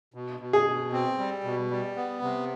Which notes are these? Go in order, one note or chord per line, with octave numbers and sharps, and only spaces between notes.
B2
B2
G#4
B2
C4
G3
B2
G3
B3
C3